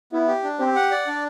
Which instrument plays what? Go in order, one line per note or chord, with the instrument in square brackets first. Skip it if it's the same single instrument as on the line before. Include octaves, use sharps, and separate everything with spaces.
[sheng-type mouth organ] B3 [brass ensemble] E4
[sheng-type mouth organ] G4
D4
[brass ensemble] C4 [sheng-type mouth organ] G4
[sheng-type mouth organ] F#5
D5
D4